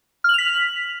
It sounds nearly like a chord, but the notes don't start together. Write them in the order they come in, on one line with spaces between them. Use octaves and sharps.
F6 F#7 F7 B6